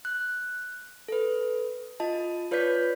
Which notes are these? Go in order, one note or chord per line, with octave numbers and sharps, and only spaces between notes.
F#6
A4 B4
F4 D#5 A5
F4 B4 C#5 D5 G6 B6